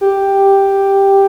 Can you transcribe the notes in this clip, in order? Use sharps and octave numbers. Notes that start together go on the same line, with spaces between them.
G4